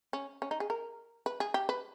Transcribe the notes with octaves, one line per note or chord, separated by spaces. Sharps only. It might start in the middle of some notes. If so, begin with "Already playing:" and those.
C#4
C#4
D#4
G#4
A#4
B4
G#4
G4
B4